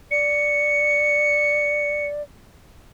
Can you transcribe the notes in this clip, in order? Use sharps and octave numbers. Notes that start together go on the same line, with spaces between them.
D5 C#7